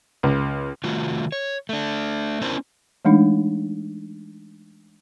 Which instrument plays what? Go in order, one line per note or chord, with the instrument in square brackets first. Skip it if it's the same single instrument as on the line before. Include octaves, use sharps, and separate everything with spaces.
[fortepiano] C#2
[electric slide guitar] C3 D#3 A3 F4 F#4
C#5
A3 D4
B3 C#4 D4 E4 A#4 C5
[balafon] E3 G#3 A3 D4 D#4